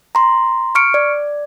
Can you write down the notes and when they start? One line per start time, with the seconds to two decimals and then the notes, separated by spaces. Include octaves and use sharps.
0.15 A#5 C6
0.75 C#6 F6 C#7 D7
0.94 D5